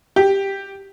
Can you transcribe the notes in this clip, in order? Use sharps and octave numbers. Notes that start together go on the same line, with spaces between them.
G4